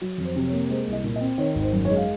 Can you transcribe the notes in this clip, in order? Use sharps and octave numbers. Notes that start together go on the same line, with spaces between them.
F#3
F2
C5
C3
C#5
A#3
G#3 C5
C2
D#5
A#2
D#5
C4
D#3 C#5
G#1
C5
F#2
C#5
G#3
F5